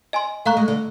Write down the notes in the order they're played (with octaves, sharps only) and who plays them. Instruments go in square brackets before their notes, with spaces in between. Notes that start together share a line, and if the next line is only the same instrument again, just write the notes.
[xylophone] D#5 G#5 C6
[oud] A3 [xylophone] F5 A#5 C#6 F#6
[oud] G#3
D3